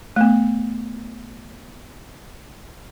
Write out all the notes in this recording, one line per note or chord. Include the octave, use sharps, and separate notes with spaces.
A3 B3